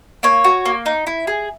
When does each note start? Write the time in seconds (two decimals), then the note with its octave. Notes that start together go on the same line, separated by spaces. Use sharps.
0.23 A#3 C#5
0.44 F#4
0.66 A#3
0.86 D#4
1.07 E4
1.27 G#4